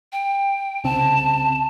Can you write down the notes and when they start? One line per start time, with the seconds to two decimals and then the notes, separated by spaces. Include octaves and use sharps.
0.12 G5
0.84 C2 C#3 C4 A5